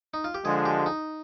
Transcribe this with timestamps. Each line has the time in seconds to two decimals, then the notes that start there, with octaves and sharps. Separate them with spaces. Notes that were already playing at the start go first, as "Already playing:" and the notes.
0.14 D#4
0.24 F4
0.34 G4
0.45 D3 F3 G#3 G#4
0.66 G4
0.86 D#4